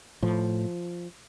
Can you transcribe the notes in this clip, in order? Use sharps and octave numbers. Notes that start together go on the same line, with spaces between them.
A2 F3